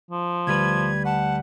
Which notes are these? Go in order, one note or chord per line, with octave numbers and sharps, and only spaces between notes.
F3
D2 G3 B4 G#6
F#5 A5